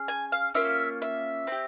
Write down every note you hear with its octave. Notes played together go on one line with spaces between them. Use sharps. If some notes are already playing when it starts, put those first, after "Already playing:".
Already playing: C#4 G#4
G#5
F5
A#3 C#4 F4 E5
E5
C4 G4